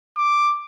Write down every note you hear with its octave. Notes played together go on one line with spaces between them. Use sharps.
D6